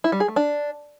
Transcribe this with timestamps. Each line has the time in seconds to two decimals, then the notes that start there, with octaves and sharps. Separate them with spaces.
0.04 E4
0.12 G3
0.20 G#4
0.28 A3
0.36 D4